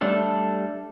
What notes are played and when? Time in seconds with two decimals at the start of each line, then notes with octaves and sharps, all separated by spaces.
0.01 G3 A3 D4 A4